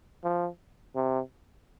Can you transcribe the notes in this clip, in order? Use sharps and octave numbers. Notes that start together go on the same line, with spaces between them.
F3
C3